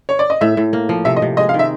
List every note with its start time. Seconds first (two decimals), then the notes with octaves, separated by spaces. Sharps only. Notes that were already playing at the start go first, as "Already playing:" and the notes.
0.09 C#5
0.19 D5
0.30 D#5
0.41 A2 E5
0.57 A2
0.73 A#3
0.89 F3
1.05 C3 E5
1.17 D#5
1.22 C3
1.37 G#3 D#5
1.49 F5
1.54 D#3
1.59 E5